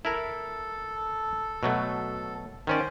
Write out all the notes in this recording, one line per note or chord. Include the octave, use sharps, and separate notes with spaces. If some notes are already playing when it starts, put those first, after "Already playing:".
E4 A4 A#4
B2 F#3 A3
D#3 C#4 C5 D5